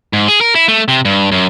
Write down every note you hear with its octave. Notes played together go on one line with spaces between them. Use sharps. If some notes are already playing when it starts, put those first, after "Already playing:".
G#2
G#4
A#4
E4
A3
C3
G2
F#2